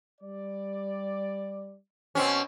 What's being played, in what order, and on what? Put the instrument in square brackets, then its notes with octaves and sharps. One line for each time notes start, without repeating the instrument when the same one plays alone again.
[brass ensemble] G3 D5
[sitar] B2 C4 C#4